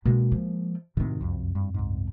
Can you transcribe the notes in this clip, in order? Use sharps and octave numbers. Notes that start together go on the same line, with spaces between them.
B2 G#3 A#3 D4
F3
F#2 A2 C3 D#3 C4
C2 F2
G2
C2 G#2